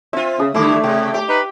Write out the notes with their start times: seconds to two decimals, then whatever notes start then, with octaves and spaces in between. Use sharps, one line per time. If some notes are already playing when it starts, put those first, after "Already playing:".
0.13 C4 F4 E5
0.40 C#3 D#6
0.54 D3 G3 A3 E4 C6 D6
0.84 C3 G5
1.14 G4 G5 D6
1.29 D#4 B4